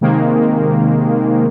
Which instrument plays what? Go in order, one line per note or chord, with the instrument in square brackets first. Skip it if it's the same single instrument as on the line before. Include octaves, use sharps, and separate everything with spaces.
[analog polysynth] C3 D#3 G#3 A#3